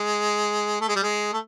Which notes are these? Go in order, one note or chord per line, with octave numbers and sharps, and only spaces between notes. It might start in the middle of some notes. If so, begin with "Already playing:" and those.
Already playing: G#3
A3
G#3
G3
G#3
A3